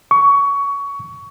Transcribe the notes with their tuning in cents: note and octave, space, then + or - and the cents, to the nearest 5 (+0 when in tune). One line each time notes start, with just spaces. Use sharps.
C#6 +20